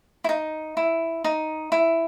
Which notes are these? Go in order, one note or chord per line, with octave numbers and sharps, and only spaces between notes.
E4
D#4
E4
D#4
E4